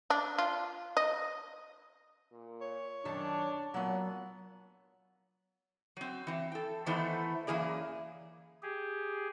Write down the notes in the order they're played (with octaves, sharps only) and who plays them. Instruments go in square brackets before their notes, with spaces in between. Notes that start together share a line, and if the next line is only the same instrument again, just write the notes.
[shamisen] D4
F4
D#5
[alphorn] A#2
[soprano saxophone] C#5
[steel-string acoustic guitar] F#2 D#3 A5 [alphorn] D4
[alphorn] A#2 [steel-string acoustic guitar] F#3 B3 [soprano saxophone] F#5
[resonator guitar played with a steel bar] F#3 C4
E3 C4
A4 G5
D#3 E3 A3 B3 E4 C5
F#2 E3 A#3 G#4 D5
[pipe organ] G4 G#4